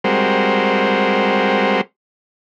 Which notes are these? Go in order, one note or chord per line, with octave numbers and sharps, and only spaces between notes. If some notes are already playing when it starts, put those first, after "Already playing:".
G3 G#3 C4 F#4 A#4 C5